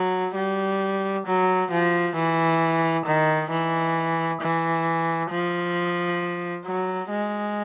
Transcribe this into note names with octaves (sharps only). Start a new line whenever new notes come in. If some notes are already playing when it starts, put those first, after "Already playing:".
Already playing: F#3
G3
F#3
F3
E3
D#3
E3
E3
F3
F#3
G#3